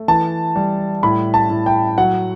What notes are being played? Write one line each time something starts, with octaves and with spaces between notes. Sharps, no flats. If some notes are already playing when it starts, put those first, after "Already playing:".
Already playing: A3
E3 A5
G3
A2 B5
A5
A2
G5
F#3 F#5